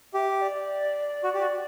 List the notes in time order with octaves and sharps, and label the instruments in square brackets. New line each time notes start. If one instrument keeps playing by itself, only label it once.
[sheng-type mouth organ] G4 [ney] E5
[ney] D5
[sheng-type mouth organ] F#4
G4
F#4